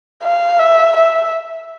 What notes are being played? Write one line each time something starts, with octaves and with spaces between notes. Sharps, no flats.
F5
E5
E5